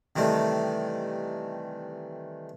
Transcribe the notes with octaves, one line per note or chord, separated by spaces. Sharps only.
C3 D#3 E3 G3 A3